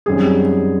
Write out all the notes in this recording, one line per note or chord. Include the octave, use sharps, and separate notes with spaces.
F#2 D#3 G3 C4 G#4
G4